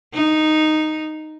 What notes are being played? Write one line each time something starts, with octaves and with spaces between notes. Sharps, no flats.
D#4